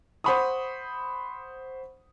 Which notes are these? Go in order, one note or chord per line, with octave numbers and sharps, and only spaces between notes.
C5 F#5 B5 C#6 D#6